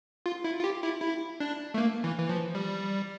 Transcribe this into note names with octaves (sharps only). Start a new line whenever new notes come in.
F4
E4
F4
G4
E4
E4
D4
A3
A#3
E3
E3
F3
G3